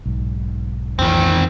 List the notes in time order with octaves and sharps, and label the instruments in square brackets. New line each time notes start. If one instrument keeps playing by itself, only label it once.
[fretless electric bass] B1 G#2
[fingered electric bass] F2 E3 [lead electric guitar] D#3 C4